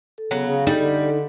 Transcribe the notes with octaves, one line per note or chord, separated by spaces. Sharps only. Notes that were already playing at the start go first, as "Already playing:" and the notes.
A4
C#3 F#3 B3
C#3 F5
G3 D#4 A4
D3